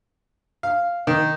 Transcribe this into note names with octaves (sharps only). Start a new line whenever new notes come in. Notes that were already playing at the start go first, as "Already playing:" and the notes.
F5
D#3